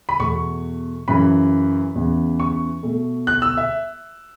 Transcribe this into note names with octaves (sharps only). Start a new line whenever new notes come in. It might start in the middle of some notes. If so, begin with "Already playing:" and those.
B5
E2 B2 A3 C#6
F#2 C#3 E3 B5
E2 C#3 E3
C#6
B2 A3
F#6
E6
E5